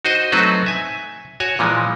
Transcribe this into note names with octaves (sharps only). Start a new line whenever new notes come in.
D#4 F#4 C5 D#5
F#3 A3 C4 D#4 F#4 B4
E5 G#5
F#4 C#5 G#5
A#2 E3 F3 G#3